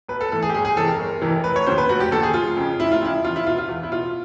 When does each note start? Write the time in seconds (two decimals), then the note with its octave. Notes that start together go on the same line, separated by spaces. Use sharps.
0.09 B1 B4
0.21 A4
0.32 A2 E3 A4
0.43 G#4
0.49 G4
0.54 G1 G#4
0.65 G#4
0.77 F2 C3 E3 A4
0.88 A#4
0.99 G1
1.21 F2 C3 E3
1.44 F1 B4
1.56 C#5
1.66 D#2 D3 F3 C5
1.78 B4
1.89 F1 F#4
2.00 G4
2.11 D#2 D3 F3 A4
2.23 G#4
2.34 F1 F4
2.56 F2 C#3 F3
2.79 F1 E4
2.92 F4
3.02 F2 C#3 F3 E4
3.24 E2 F4
3.36 E4
3.47 B2 F4
3.58 F4
3.69 E2
3.83 E4
3.92 B2 F4